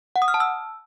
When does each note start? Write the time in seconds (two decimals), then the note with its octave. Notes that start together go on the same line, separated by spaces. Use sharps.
0.16 F#5
0.22 D#6
0.28 F6
0.34 A5
0.40 E6